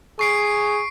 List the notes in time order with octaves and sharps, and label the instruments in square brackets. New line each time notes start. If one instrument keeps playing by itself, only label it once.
[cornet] G#4 [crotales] C#6 C7 D7